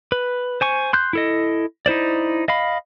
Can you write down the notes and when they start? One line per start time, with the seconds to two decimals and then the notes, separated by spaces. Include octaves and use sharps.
0.12 B4
0.61 C5 G#5 C#6
0.93 C6 F#6 G6
1.13 E4 A4 D#5
1.86 D#4 E4 C5 D5
2.48 D#5 F5 B5